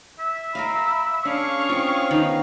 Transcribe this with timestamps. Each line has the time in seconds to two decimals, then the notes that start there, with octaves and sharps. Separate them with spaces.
0.19 E5
0.55 A#4 D#5 F5 B5
1.25 C#4 D4 G#4 F5 C#6
1.69 C4 F4
2.11 D#3 B3